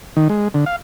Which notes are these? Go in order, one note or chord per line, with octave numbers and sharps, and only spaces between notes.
D#3
G#3
D3
F5